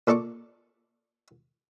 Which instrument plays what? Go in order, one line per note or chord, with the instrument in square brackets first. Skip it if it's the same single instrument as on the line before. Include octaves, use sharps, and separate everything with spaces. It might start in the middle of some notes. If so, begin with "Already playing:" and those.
[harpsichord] A#2 A4 D5 C#6 D6